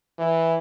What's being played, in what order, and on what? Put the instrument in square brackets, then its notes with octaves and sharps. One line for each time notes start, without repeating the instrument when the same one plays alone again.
[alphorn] E3